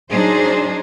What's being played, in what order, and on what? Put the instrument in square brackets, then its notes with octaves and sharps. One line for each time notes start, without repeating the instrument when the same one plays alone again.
[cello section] F#3 D4 D#4 G#4 C5